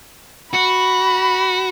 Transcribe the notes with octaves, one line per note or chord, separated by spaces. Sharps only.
F#4 B5